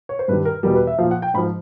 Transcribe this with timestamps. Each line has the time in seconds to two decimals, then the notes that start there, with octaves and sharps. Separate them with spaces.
0.09 C#5
0.19 C5
0.28 G2 D#3 G3 B4
0.45 A#4
0.63 E2 B2 G3 A#4
0.75 B4
0.87 E5
0.98 A#2 F3 F5
1.11 F#5
1.22 G5
1.34 G#2 B5
1.38 F3